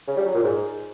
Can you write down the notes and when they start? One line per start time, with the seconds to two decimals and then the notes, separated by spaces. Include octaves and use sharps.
0.08 C#3
0.16 G3
0.25 F#3
0.34 A#2
0.43 G#2